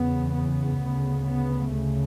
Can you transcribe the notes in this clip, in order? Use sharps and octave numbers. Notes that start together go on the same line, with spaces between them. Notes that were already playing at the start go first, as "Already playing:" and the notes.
Already playing: E2 C#3 B3
B3
D2 C#3
B3
D2 C#3 A3